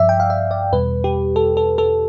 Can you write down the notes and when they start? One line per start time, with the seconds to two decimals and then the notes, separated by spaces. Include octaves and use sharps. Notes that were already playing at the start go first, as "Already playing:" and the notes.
Already playing: G2 F3 D5 E5
0.09 G5
0.20 F5
0.30 E5
0.51 D5
0.72 E2 B2 G3 B4
1.04 G4
1.36 A4
1.57 A4
1.78 A4